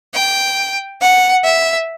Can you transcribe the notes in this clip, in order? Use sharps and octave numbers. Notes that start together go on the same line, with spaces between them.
G5
F#5
E5